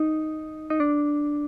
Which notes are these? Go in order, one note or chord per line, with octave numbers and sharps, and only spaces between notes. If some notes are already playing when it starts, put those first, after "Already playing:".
Already playing: D#4
D#4
D4